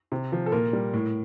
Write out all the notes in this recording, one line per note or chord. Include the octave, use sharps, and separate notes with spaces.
C3
F3
A4
A#2 A#4
G3
A2